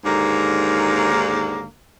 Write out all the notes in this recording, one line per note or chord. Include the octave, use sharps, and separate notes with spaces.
D#2 G#2 D3 A#3